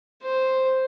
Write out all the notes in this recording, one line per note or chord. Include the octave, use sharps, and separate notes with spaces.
C5